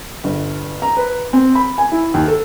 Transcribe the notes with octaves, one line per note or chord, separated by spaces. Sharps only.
G1
A#5
B4
C4
B5
G#5
E4
D#2
A4